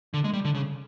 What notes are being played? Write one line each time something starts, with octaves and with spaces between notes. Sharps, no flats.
D3
G#3
G3
D3
C#3